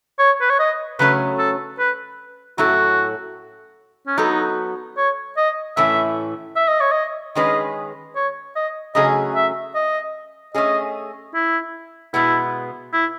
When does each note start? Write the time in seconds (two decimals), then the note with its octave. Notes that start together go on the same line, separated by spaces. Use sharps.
0.19 C#5
0.41 B4
0.50 C#5
0.59 D#5
0.99 C#3 F#3 A3 C#4 B4
1.39 A4
1.79 B4
2.58 A2 F#3 C#4 E4 F#4 A4
4.07 C#4
4.18 F#3 B3 D#4 F#4 A4
4.97 C#5
5.37 D#5
5.77 A2 E3 A3 C#4 E5
6.56 E5
6.68 D#5
6.81 C#5
6.91 D#5
7.35 D#3 G#3 C#4 G#4 B4 D#5
8.16 C#5
8.56 D#5
8.95 C#3 F#3 A3 C#4 G#4 D#5
9.35 E5
9.75 D#5
10.54 A3 C#4 G#4 D#5
11.34 E4
12.14 B2 G#3 B3 E4
12.93 E4